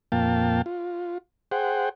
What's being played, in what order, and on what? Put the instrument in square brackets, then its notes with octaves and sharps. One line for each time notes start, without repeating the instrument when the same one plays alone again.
[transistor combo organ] F2 A#2 A#3 F5 G5 A5
F4
G#4 C5 F#5 G5